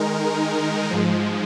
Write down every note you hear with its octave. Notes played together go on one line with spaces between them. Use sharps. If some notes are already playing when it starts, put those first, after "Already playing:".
Already playing: D#3 G#3 D#4 A#4
G#2 F3 G#3